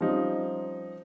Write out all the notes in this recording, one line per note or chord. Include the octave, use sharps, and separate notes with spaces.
F3 G3 C4 C#4 D#4